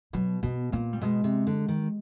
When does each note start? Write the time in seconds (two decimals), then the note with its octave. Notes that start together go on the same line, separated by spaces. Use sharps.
0.13 B2 F#3
0.43 B2 B3
0.72 A#2 A#3
0.93 G3
1.02 B2 G#3
1.24 C3
1.47 D3
1.68 D#3